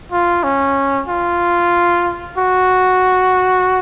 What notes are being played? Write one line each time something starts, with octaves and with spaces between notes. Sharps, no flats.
F4
C#4
F4
F#4